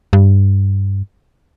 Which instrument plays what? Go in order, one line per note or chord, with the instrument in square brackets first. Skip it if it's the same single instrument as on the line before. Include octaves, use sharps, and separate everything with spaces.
[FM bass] G2